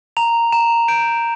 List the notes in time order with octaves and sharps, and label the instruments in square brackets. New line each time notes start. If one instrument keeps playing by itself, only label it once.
[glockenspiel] A#5 F7
A#5 E7
G6 D7